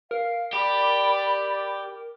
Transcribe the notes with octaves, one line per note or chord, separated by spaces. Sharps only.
A#4 F5
G4 D5 B5